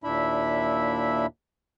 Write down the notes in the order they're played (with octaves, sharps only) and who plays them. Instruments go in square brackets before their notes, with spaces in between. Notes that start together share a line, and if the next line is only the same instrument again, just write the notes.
[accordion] D#2 A#2 D4 E4 E5 B5